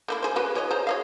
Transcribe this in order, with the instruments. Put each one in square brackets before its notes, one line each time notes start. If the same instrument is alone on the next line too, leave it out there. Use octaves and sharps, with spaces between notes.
[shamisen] A3 A#3 E4
G#4 C5
C#3 F#4 B4
E3 C#5 D#5
G#4 C5 A#5
C#5 D#5 F5